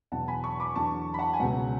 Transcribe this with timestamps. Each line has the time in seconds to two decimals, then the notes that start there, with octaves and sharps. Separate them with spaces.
0.12 E2 B2 F#3 F#5 A5
0.28 G#5 B5
0.43 A5 C#6
0.60 B5 D6
0.75 E2 D3 F#3 A5 C#6
1.14 B5
1.19 F#5 A5
1.33 G#5
1.40 C#2 B2 F#3 F#5